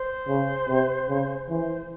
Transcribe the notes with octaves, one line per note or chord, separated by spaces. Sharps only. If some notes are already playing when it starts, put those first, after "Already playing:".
Already playing: C5
C#3
C3
C#3
E3 C5